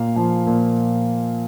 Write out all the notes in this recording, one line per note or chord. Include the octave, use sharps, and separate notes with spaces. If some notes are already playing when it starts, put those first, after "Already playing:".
Already playing: A#2 A#3 F5
F3
A#2